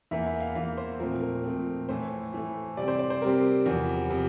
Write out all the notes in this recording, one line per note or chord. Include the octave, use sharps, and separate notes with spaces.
E2 E3 A#3 E5
E5
F5
E2 E3 A#3 F5
C5
A#2 F3 A3 C4 A#4
A#4
A#2 F3 A3 C4
A2 E3 A3 C5
A2 E3 A3
C3 G3 C4 D5
C5
D5
C5
C3 G3 C4 A#4
E2 C3 F3
C3 F3